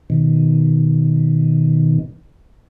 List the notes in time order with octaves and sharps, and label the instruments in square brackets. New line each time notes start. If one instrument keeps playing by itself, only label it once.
[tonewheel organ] B2 D#3